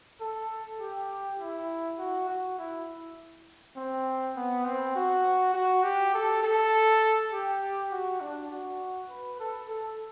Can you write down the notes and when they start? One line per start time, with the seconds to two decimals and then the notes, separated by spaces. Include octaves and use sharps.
0.20 A4
0.79 G4
1.39 E4
1.98 F#4
2.28 F#4
2.58 E4
3.76 C4
4.36 B3
4.65 C4
4.95 F#4
5.54 F#4
5.83 G4
6.14 A4
6.43 A4
7.32 G4
7.91 F#4
8.21 D4
8.51 F#4
9.10 B4
9.40 A4
9.69 A4